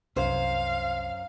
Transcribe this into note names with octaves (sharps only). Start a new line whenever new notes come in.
C2 F#2 C5 F5